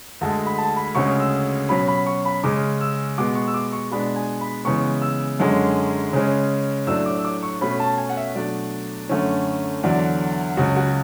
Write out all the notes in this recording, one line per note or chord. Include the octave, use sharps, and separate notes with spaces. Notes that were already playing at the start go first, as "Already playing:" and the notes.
D2 D3 G#3 A5
B5
A5
B5
D2 C#3 G#3 C#4 C#6
E6
B2 F#3 C#4 B5
B5
C#6
B5
C#3 G#3 C#4 D6
E6
B2 G#3 B3 D6
C#6
E6
D6
C#6
B2 G#3 B3 D4 B5
G#5
B5
C#3 E3 G#3 B3 C#6
E6
F#2 D3 G#3 C#4
C#3 G#3 C#4
A2 F#3 A3 D4 E6
D6
E6
D6
C#6
B2 A3 C#4 B5
A5
G#5
F#5
E5
B2 F#3 A3 D4 D5
F#2 D3 A3 C#4
E2 D3 F#3 D5
C#2 C#3 F#3 F#4
F#4